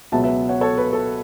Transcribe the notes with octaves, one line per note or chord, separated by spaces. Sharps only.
C#2 B2 F#3 B3 E5 A5
B4 E5
C#5 F#5
A4 C#5
B4
A4